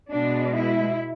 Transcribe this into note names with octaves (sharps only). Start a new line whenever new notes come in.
B2 G#3 D4
E4